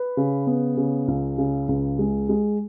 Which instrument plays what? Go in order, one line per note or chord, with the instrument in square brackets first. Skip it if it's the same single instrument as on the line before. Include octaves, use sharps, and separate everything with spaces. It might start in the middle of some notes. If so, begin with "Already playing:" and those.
Already playing: [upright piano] B4
C#3
B3
C#3
C#2
C#3
C#2
G#3
G#3